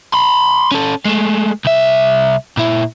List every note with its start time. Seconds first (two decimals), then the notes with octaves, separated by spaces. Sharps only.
0.14 B5 C6
0.72 C#4 A4
1.05 G#3 A3
1.65 C2 E5
2.57 A#2 E4